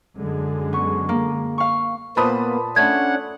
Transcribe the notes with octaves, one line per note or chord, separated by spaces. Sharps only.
F#2 D3 G#3
B3 C#6
A#3
F5 C#6
A#2 A#3 B3 B4 C5 A5 B5 D#6
A3 C#4 D4 F#5 G#6